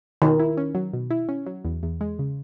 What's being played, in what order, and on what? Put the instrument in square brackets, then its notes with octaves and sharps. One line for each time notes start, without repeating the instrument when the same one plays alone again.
[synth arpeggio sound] B2 [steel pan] D#3
[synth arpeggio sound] E4
C#4
F#3
B2
E4
C#4
F#3
E2
E2
G#3
C#3